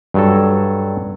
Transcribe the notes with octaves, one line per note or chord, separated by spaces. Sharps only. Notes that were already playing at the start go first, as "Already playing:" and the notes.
G2 F#3 A4